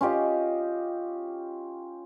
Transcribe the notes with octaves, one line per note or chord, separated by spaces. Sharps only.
C#4 F4 G4 D#5